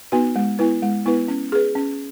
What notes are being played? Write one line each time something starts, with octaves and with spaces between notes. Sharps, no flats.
B3 D#4 F#4 B4
G#3
B3 E4 B4
G#3
B3 E4 B4
C#4
G#4 B4
C#4